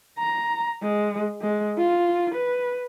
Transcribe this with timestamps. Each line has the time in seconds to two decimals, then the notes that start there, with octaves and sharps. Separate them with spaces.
0.19 A#5
0.83 G#3
1.42 G#3
1.78 F4
2.34 B4